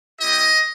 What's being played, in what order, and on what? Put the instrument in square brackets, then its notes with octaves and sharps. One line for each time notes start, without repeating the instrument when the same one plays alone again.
[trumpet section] G3 C4 E4 G4 D#5